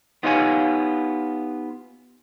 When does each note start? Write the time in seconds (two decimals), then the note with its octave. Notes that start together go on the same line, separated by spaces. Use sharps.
0.23 B3 D#4 F4 G4 C#5 G#5